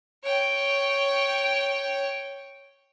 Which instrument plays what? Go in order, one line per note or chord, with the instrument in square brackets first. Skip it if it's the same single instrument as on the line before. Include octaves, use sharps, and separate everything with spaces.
[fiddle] C#5 G5